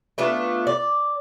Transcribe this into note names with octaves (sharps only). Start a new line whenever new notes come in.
A3 B3 D4 F4
D5